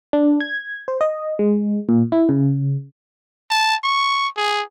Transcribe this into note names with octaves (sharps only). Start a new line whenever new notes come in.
D4
G#6
C5
D#5
G#3
A#2
E4
C#3
A5
C#6
G#4